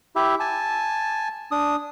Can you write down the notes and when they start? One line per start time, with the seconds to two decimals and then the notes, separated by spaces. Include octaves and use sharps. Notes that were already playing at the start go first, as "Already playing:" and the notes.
0.16 E4 G4 E5
0.40 G#5 A5
1.51 D4 D#6